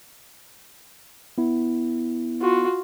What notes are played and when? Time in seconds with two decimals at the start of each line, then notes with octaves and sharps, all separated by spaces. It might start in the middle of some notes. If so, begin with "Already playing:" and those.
1.38 B3 E4
2.41 F4 F#4